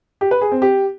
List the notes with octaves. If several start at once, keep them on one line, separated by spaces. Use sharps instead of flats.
G4
B4
G#4
C4
G4